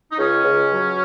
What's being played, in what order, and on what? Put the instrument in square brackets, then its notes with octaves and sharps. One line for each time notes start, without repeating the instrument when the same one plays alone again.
[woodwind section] D#4
C#2 C#4
C#2
F#3